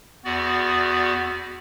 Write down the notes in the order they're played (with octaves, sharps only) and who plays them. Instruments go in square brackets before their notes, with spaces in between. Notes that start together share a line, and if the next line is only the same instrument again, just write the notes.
[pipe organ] E2 B3 F#4 D5